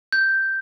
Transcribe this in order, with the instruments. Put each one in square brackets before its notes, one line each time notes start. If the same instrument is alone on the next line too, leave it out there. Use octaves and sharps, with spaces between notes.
[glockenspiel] G6